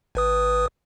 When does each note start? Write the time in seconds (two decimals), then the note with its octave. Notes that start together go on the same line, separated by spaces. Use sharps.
0.15 G#1 B4 D#6